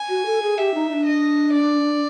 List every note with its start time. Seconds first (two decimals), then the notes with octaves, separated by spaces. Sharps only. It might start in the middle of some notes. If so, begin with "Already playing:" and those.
Already playing: G#5
0.09 F#4
0.26 A4
0.42 G#4
0.58 G4 E5
0.74 D#4
0.90 D#4
0.93 D4
1.06 D#5
1.54 D5